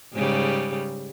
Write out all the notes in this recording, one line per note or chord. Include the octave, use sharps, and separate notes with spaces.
G#2 C#3 G3